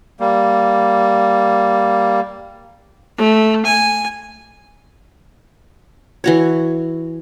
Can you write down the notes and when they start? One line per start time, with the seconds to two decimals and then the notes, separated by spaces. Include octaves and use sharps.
0.20 G3 A#3
3.18 A3
3.66 G#5
6.24 E3 F#4 C#5